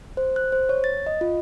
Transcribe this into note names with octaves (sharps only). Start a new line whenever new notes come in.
C5
F#6
C5
C#5
A6
D#5
F4